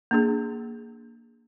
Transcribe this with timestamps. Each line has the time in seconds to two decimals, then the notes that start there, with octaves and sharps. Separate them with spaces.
0.11 A#3 D4 G#4